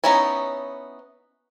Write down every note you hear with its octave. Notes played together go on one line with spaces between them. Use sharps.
B3 C#4 D#4 E4 C#5